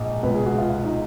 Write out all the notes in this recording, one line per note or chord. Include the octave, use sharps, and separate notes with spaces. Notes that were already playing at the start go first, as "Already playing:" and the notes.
Already playing: A#1 G#2
C#2 B2 B4
G#4
F#4
F4
F4
D#4